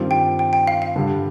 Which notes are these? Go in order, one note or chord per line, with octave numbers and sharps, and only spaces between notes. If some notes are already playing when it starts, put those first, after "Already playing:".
Already playing: G2 D#3 G3 C4 F4
G5
G5
G5
F5
F5
G2 D3 G3